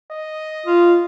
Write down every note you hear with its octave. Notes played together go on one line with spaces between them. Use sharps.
D#5
F4